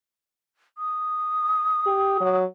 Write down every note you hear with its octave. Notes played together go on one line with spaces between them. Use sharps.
D#6
G4
F#3